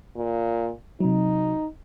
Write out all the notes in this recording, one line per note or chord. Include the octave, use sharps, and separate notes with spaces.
A#2
C3 F#3 D#4